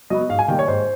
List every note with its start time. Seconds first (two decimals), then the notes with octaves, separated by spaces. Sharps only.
0.10 F#3 B3 D#5
0.29 G#2 F5
0.39 G#5
0.48 D#3 G3 A#3 G5
0.59 C#5
0.68 G#2 C5